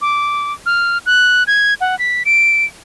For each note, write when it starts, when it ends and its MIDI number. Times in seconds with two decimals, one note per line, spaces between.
0.02 0.53 86
0.66 0.98 89
1.06 1.43 90
1.47 1.74 92
1.81 1.98 78
1.99 2.23 95
2.25 2.65 98